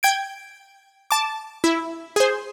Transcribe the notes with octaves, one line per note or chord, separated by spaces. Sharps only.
G5 G#6 D7
A5 D6
E4
G#4 C5